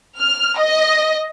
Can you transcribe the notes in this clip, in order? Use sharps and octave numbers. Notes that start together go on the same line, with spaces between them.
F6
D#5